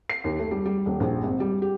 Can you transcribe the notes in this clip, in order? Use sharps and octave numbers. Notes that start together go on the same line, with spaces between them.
C7
D#2
A3
G3
G3
D#1
A#1
G#1
G3
G4